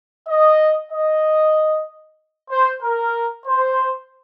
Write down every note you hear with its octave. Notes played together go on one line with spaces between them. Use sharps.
D#5
D#5
C5
A#4
C5